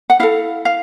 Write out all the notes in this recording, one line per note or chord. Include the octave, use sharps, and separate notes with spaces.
F#5
E4 A4 F5
F5